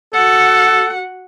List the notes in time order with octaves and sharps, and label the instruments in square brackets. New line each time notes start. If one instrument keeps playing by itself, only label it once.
[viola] F#4 F#5 [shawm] A4